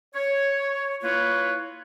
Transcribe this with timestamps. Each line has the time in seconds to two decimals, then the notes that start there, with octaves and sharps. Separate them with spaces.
0.15 C#5
1.02 A#3 E4 F4 B4 C#5